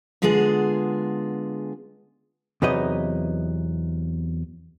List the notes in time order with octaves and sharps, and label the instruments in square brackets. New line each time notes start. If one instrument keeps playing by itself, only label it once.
[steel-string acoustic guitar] D3 G#3 B3 F4 G#4
[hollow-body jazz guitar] E2 C3 F#3 B3 D#4 D#5